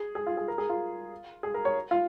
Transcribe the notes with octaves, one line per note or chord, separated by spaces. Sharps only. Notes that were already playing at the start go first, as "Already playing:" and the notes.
Already playing: G#4
G#4
F4
G#4
A#4
G#4
F4
G#4
A#4
C#5
F4